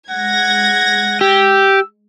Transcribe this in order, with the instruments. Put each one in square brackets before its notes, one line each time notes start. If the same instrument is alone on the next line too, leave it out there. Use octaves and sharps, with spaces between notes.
[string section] G#3 G#6 A#6 [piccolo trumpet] F#5
[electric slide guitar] G4 [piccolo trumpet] E6